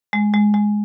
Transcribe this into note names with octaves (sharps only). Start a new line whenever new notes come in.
G#3
G#3
G#3